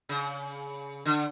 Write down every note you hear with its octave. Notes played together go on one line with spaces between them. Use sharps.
C#3
D3